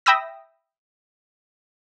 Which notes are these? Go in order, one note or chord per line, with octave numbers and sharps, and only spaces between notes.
E5 G5 B5 D#6 E6 A#6